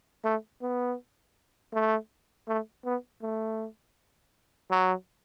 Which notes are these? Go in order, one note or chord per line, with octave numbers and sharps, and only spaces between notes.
A3
B3
A3
A3
B3
A3
F#3